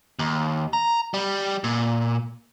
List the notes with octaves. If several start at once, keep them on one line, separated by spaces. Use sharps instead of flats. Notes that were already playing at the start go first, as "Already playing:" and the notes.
D#2
A#5
G3
A#2